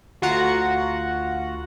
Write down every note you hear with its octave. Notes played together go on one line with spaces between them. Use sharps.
D2 F4 F#4 F#5 A#5